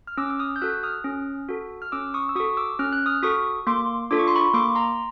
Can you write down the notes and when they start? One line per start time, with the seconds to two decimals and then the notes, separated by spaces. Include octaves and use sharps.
0.07 F6
0.17 C#4 D6 E6
0.30 E6
0.39 D#6 F6
0.56 G6
0.62 F#4 A4 E6 F#6
0.72 F#6
0.83 D#6 F6
1.04 C#4
1.49 F#4 A4
1.82 F6
1.92 C#4 D6 E6
2.14 C#6 D#6
2.29 E6
2.35 F#4 A4 C#6 D#6
2.57 D6 E6
2.79 C#4 F6
2.93 F#6
3.06 D#6 F6
3.23 F#4 A4 C#6 D#6
3.67 A#3 C6 D6
4.11 D4 F4 A4 D6
4.19 C#6
4.28 C6
4.36 B5 C#6
4.54 A#3 C6 D6
4.75 A#5 C6